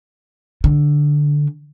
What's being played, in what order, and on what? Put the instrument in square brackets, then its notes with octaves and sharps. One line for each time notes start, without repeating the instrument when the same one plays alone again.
[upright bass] D3